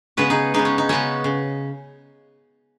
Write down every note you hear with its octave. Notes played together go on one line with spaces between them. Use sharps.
C#3 G#3 B3 F#4 B4
D#4 G#4
C#3 G#3 B3 D#4
C#4
D#4
C#3 G#3 B3 C#4 F#4
C#3